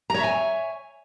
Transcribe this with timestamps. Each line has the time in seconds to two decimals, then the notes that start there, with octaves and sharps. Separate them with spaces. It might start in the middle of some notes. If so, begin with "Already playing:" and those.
0.10 A#5
0.14 C#5
0.19 E5
0.24 G#5